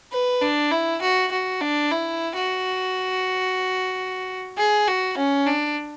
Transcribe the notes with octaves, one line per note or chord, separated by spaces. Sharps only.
B4
D4
E4
F#4
F#4
D4
E4
F#4
G#4
F#4
C#4
D4